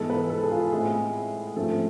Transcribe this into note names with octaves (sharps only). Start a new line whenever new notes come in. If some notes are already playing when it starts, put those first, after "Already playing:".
Already playing: G#2 E3 G#3 B3 A4
B4
A4
G#4
F4
A2 G#3 C4 G#4
G#2 F3 A3 C4 A4